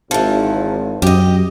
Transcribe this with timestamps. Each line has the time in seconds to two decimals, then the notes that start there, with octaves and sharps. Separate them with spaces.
0.11 G#1 E3 F3
1.02 F#2 G4 D#5